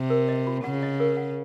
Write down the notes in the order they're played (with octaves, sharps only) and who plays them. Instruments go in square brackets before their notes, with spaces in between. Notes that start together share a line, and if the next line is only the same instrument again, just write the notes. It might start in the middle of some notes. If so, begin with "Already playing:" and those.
Already playing: [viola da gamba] C3
[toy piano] A#4
D#5
F4
[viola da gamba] C#3 [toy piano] F#5
[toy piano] D#5
A#4
F#5